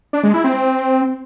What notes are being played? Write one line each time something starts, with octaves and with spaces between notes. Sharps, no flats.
D4
G#3
E4
C4